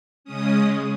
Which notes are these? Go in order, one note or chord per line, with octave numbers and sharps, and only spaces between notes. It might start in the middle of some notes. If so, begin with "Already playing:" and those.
C#3 G#3 C#4 D#6